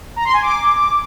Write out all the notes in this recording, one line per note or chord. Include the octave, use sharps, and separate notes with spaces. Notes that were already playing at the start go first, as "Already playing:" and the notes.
A#5
C6
G#5
D6